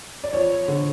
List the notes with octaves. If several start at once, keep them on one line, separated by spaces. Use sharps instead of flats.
D5
F2 C#5
D3